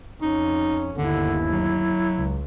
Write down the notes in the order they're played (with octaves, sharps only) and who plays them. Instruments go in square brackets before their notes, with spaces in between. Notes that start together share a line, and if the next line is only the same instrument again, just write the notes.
[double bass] F2 C#4 [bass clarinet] D#4
[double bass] G1 D#2 [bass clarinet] D3 [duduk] E4
[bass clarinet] F#3
[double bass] C#2